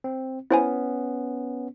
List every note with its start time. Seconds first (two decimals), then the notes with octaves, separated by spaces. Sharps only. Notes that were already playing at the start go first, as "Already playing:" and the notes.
0.04 C4
0.51 B3 C#4 E4 C5 G#5